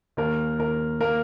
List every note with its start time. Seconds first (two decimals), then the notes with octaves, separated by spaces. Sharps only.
0.17 D#2 A#4
0.58 D#2 A#4
1.01 A#3 A#4